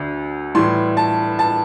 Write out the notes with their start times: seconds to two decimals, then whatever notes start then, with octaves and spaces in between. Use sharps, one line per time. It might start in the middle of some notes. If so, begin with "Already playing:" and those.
Already playing: D2 D3
0.55 A2 E3 G3 C6
0.97 A5
1.39 A5